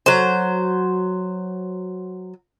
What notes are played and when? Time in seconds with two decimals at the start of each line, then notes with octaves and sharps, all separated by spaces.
0.06 F#3 C5